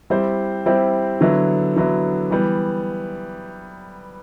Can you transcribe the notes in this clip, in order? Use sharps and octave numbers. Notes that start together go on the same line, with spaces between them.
G3 C4 E4 G4 C5
G3 C4 E4 G4 C5
D3 F#3 B3 E4
D3 F#3 B3 E4
E3 G3 B3